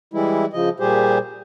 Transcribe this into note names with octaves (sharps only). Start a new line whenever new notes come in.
E3 G3 G#3 E4
C#3 F3 D#5
A#2 G3 G4 G#4 C5